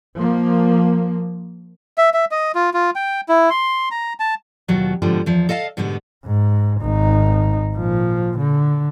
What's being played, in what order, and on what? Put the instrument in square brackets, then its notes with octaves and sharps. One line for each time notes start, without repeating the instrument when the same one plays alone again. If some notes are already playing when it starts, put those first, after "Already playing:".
[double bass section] F3 A#3
[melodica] E5
E5
D#5
F4
F4
G5
E4
C6
A#5
A5
[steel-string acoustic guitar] D#2 B2 F#3 F4
G#2 B2 D3 F3 G3
E2 F3
A4 D#5 F5 G#5 A5
G#2 B2 D3 G3 B3
[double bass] G#2
G#1 D#4
A#2 F3
D3